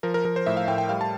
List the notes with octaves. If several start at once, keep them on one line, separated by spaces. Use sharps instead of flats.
F3 A#4
A#4
F3 A#4
C5
A2 E5
F5
A2 G5
G5
G3 F5
A5